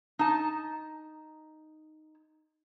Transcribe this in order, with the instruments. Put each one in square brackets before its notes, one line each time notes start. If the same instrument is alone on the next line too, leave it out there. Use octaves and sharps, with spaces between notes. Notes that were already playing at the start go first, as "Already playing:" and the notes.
[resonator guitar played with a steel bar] D#4 A5